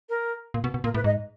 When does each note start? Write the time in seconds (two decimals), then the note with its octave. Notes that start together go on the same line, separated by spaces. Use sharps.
0.09 A#4
0.54 A#2
0.64 B2
0.74 B2
0.84 A#2 A#4
0.94 A2 B4
1.04 G#2 D#5